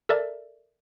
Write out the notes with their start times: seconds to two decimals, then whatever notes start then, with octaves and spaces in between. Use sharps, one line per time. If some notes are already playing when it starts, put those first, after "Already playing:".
0.09 A4 A#4 D5 E5